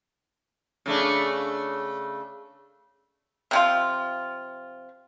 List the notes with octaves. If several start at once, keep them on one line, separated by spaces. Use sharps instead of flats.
C#3 A3 D4
C3 F3 F4